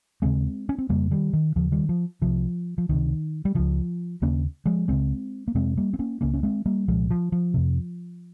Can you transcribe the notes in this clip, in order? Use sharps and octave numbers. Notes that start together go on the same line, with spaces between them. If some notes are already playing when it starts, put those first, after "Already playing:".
D#2 C#3 G#3 C4
C#4
C4
F2 C#3 G3 A#3
D#3 G3
D#3
D#2 C#3 F3
D#3 G3
F3
C2 C3 F3
F3
C#2 C3 D#3
G3
C#2 C#3 F3
D#2 C#3 A#3 C#4
F3 G#3
C#2 C#3 G#3 C4
A#3
F2 C3 G#3 C4
G3 A#3
C4
A#3 C#4
C#2 C#3 A#3 C#4
C#4
G#3 C4
G3 A#3
C2 A#2 F3 G#3
F3
F3
F2 C3